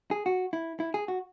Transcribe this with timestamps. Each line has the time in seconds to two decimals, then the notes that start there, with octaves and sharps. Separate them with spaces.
0.11 G#4
0.26 F#4
0.53 E4
0.80 E4
0.94 G#4
1.08 F#4